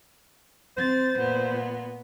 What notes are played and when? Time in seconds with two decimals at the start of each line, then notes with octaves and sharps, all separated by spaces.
0.77 C4 C5 A6
1.19 A#2 B3